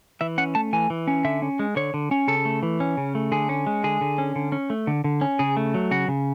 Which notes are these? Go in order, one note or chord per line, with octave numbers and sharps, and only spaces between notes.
E3 E5
C#4 F#5
A3 A5
E3 G#5
E3
C#4
D3 E5
C#4
G#3
D3 C#5
D3
C#4
C#3 A4
A3
E3
C#4
C#3
A3
D3 G#4
C#4
G#3
D3 G#4
D3
C#4
D3
C#4
A3
D3
D3
C#4
C#3 G#4
A3
F#3
C#3 F#4
C#3